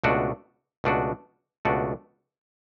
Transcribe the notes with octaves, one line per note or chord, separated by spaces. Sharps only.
C#2 B2 A3 D4 F#4
C#2 B2 A3 D4 F#4
C#2 B2 A3 D4 F#4